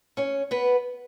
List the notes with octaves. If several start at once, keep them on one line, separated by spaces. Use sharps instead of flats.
C#4 C#5
B3 B4